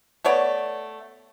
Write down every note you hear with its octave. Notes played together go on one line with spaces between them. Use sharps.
A3 B3 C#5 D5